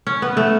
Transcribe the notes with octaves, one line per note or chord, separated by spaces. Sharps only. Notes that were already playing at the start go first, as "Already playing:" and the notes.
C#4
B3
A3